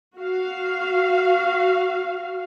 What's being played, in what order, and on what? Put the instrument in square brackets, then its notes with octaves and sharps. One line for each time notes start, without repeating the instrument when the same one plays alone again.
[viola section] F#4 F5